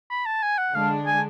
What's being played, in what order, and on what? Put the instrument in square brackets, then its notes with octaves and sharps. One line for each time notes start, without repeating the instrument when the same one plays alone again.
[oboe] B5
A5
G#5
F#5
[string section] D3 G#3 D4 [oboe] F5
[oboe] G#5